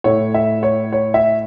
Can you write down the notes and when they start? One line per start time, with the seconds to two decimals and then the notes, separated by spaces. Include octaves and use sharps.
0.04 A2 A3 E4 C#5
0.34 E5
0.63 C#5
0.92 C#5
1.14 E5